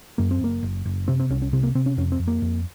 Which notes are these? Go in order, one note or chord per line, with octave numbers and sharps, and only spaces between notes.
F#2 A#3
C4
F#1 A#3
F#1
F#1
C3 C4
C4
C2 C#4
C#4
C3 C4
A#3
C3 C4
C#4
F2 C#4
C4
F2
A#3
F2